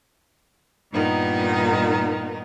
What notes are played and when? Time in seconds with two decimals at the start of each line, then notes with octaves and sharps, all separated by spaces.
0.91 G2 A#2 D#3 B3 D#4